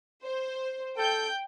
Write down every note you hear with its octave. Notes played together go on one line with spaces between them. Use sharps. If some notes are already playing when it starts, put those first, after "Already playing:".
C5
A4 G5 G6